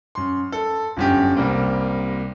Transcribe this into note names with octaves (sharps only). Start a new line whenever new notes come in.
F#2 C6
A4
G1 F#2 G4
C2 G3 A#3 C4